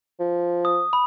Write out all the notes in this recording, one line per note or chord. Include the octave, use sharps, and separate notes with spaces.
F3
D#6
B5